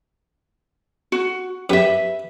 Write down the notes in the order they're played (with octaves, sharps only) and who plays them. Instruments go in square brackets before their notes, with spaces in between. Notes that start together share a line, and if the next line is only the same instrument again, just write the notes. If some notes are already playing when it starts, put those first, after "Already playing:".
[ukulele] F#4
[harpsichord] F#2 G4 [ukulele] B4 E5